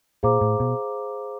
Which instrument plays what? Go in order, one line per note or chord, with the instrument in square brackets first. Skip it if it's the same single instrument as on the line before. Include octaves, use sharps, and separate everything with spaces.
[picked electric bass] A#2 [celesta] G#4 C5 F5 A#5 D6
[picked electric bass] A2
B2